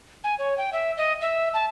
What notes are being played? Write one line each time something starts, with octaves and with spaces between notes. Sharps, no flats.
G#5
C#5
G5
E5
D#5
E5
A5